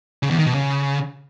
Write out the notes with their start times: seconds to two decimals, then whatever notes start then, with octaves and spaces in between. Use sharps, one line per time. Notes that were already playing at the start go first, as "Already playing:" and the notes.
0.23 C#3
0.31 E2
0.38 D#3
0.46 B2
0.54 C#3